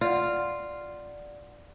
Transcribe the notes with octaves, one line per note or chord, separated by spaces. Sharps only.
F4 D5 F#5